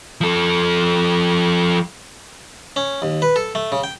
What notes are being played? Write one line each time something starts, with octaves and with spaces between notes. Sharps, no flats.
F3 A4
C#4
D#2
B4
A4
A3
C#3
G5